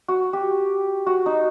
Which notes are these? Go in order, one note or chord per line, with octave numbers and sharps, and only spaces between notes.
F#4
G4
F#4
D#4